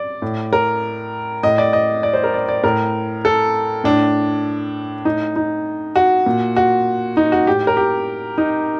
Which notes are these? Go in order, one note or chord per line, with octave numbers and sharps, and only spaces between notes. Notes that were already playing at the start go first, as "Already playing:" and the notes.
Already playing: D5
A2
A#4
A2 D#5
D5
D#5
D5
C5
A#4
D5
D5
A2 A#4
A4
A2 D4
A2 D#4
D#4
F#4
A#2
F#4
D#4
F#4
A2 G4
A#4
G4
D#4